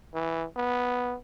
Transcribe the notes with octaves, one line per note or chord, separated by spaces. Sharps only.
E3
B3